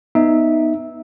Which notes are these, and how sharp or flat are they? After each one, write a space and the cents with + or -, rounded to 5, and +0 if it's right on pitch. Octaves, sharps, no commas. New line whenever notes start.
B3 +0 D#4 +0 E5 -10